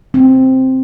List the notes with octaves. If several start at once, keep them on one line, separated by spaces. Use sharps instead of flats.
C4